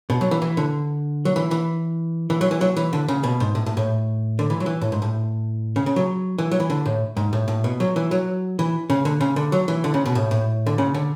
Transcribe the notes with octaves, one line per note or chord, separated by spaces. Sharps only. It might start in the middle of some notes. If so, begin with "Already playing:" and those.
B2
F#3
E3
E3
D3
F#3
E3
E3
E3
F#3
E3
F#3
E3
D3
C#3
B2
G#2
A2
A2
A2
D3
E3
F#3
E3
A2
G#2
A2
C#3
C#3
F#3
E3
F#3
E3
D3
A2
G#2
A2
A2
B2
F#3
E3
F#3
E3
C#3
D3
C#3
D3
F#3
E3
D3
C#3
B2
A2
A2
D3
C#3
D3